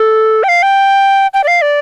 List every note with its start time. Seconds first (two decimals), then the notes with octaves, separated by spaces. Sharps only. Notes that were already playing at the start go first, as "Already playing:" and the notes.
Already playing: A4
0.43 G5
0.48 F5
0.63 G5
1.34 G5
1.44 D5
1.48 F5
1.62 D5